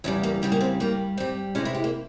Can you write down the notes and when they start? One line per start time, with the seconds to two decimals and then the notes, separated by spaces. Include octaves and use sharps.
0.04 E2 C#3 G3 C#4
0.23 A#3
0.42 E2 C#3 G3
0.52 A#3
0.61 C4
0.80 G2 G3 A#3
1.17 G2 G3 C4
1.55 F2 C3 E3 G#3 C#4
1.65 E4
1.75 G4
1.84 A#3